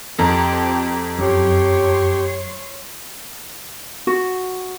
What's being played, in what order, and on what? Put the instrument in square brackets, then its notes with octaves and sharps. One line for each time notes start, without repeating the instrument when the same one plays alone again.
[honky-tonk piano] F2 A4 A#5 [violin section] C4 G4
[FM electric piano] F#2 [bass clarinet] G4 [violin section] C#5 C6
[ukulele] F#4